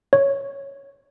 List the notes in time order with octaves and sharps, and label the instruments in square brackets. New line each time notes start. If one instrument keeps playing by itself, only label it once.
[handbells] C#5